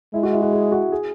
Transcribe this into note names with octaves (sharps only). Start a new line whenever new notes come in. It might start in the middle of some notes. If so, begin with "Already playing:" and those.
G#3 E4
F#4
E4
F#4
G#4
F#4
G#4